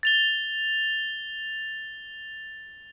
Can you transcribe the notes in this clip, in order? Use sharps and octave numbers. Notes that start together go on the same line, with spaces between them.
A6 F7 G7